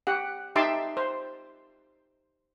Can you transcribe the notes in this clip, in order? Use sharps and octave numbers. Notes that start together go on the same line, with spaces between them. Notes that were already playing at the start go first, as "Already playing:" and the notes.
G4 F#5
D#4 G4 E5 A5 C6 D6
C5